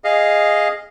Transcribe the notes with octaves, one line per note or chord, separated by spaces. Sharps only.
G#4 D#5 F5